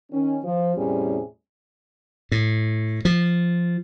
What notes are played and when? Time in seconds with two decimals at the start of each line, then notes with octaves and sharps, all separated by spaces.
0.11 D#3 C#4
0.44 F3
0.76 E2 A2 C3 G3 C#4 G#4
2.32 A2
3.05 F3